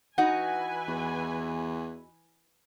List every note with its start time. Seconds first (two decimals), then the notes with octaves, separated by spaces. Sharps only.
0.18 E3 D#4 F#4 B4 F#5 G#5
0.88 E2